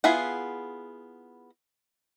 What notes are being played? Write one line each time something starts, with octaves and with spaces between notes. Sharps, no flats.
B3 E4 F4 G#4 F#5